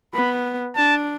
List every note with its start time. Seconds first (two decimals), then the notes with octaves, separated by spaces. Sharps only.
0.14 B3 B5
0.76 D4 A5